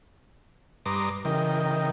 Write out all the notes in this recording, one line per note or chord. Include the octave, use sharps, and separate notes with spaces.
G2 B4 A#5 C6 D6 D#6
C#3 E3 A#4 D#5 G5